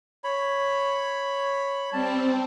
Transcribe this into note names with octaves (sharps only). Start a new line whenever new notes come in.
C#5 B5
G3 C4 A5